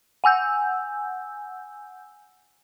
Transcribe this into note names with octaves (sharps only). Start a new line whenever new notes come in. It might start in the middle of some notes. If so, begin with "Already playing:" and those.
F#5 G#5 E6 G6